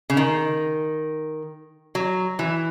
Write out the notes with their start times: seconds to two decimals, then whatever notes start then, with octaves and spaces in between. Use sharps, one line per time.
0.10 C#3
0.17 D#3
1.95 F#3
2.39 E3